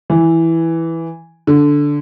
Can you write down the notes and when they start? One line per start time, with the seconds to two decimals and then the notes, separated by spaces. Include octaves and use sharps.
0.10 E3
1.47 D3